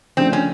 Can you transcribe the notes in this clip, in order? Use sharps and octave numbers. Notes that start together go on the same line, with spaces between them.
C#3 F3 A3 C4 D4
C#4